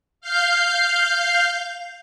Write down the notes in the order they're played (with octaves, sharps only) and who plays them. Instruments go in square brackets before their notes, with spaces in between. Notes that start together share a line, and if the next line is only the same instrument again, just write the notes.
[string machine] F5 F6 G6